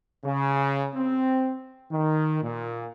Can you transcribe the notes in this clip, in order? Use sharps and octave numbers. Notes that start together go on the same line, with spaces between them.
C#3
C4
D#3
A#2